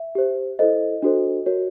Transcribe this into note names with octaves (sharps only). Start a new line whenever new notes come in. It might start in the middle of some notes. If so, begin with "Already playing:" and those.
Already playing: E5
G4 C5
E4 A4 C5 D#5
D4 F#4 A4 C5
F#4 A#4 C#5